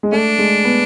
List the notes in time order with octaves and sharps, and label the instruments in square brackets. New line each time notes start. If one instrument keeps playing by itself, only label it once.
[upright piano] G#3
[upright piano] A3 [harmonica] D4
[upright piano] G#3
B3